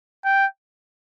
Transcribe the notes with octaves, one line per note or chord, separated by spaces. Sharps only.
G5